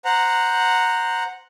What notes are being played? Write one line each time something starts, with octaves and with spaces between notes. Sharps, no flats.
C5 F#5 A#5